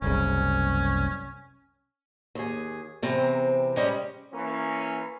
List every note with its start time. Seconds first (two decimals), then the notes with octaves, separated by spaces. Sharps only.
0.02 F#1 C2 C#3 C#4
2.35 D#2 G#4
3.02 E2 C3 C4 A#5
3.77 G3 G#3 C#4 C5 D#5
4.32 E3 A#3 C#4